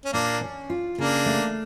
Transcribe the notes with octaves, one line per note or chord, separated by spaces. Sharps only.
C#4
A#2 A#3 D4
C#4
F4
C#3 A#3 D4
A3